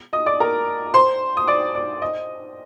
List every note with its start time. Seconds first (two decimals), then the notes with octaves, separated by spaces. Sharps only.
0.13 D#5 D#6
0.26 D5 D6
0.40 A#4 A#5
0.94 C5 C6
1.37 D#6
1.47 D5 D6
1.75 D5 D6
2.02 D#5 D#6